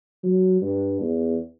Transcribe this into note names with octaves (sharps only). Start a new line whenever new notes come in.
F#3
G2
E2